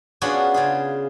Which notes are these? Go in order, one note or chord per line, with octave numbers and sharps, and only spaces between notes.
B3 C#4 D4 F4 F#4 G#4
C#3 F4 G#4